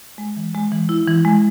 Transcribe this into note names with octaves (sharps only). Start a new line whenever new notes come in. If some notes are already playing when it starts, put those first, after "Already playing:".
G#3
E3
G#3
E3
E4
E3
G#3